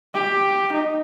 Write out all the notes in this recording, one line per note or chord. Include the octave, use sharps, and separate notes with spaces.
G4
D#4